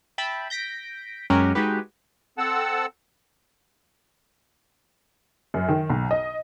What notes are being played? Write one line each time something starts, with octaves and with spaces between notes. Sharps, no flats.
E5 G5 A5 B5
G6 A#6 B6 D7
F#2 G#3 C#4 F#4 G4 A#4
G#3 D#4 F#4 G4 B4
C4 A4 F#5 A5 E6
F#2
D#3
B1
D#5